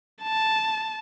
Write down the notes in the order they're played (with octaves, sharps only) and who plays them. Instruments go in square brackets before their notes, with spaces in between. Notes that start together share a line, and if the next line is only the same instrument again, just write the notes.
[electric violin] A5